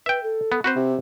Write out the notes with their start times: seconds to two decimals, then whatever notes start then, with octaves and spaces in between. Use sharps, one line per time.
0.06 B4 E5 G5
0.23 A4
0.52 B3
0.64 C4 F#4 B4 C5
0.76 C3